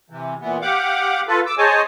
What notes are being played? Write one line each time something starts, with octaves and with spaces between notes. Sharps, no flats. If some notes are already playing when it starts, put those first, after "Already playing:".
C3 E3
A#2 E3 B3
G4 F5 F#5 D6
F4 A4 B4
D6 E6
G#4 C5 C#5 D#5 G#5 A5